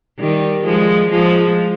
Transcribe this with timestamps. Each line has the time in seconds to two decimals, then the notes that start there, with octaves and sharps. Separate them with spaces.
0.19 D#3 G3
0.65 F3 G#3
1.11 F3 G#3